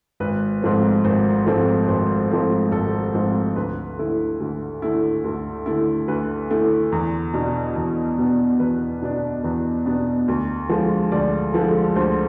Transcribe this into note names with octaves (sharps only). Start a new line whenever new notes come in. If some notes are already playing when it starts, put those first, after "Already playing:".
G#1 B4
G#2 F3 A3 C4
G#1 C5
G#2 F3 A3 C4
G#1 C5
G#2 F3 A3 C4
G#1 A4
G#2 F3 A3 C4
D2 B4
D3 A3 E4
D2
D3 A3 E4
D2
D3 A3 E4
D2 B4
D3 A3 E4
E2
B2 B3 D4
E2
B2 B3 D4
E2 B4
B2 B3 D4
E2 B4
B2 B3 D4
D2
D3 F3 G#3
D2 D5
D3 F3 G#3
D2 C5